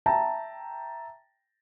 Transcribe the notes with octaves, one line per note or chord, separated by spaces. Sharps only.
E5 G5 A5 A#5